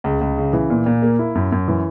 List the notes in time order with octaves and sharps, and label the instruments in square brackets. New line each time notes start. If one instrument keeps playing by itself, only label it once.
[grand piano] C#2
C#2
C#3
E3
A#2
A#2
A#3
E4
F#2
F#2
E3